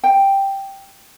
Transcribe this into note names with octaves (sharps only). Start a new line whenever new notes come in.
G5